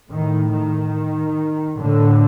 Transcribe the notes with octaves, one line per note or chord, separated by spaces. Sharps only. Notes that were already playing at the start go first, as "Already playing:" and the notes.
A2 D#3
D#3
A2 D3